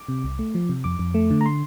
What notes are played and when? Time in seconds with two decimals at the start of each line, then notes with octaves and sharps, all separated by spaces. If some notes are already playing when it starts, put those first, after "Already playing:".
Already playing: D6
0.08 C3
0.24 C2
0.39 A3
0.55 F3
0.69 C3
0.84 F2 D6
0.99 F2
1.14 A3
1.30 D3
1.41 A#5
1.46 C6